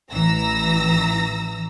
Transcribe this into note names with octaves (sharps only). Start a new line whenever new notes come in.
A1 E3 A#5 E6 A#6